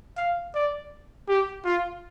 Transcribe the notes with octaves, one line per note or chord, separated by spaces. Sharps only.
F5
D5
G4
F4